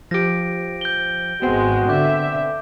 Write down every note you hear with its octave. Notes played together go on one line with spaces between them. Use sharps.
F3 G4 A#6 D7
G6 G7
G#1 G#3 B3 C4 F#4
D3 E5 D6 G6